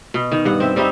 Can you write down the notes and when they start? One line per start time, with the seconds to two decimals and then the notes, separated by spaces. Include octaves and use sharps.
0.14 B2
0.32 D#3
0.45 G2 F#5
0.60 C4 E5
0.76 G3 C4 D#4 E5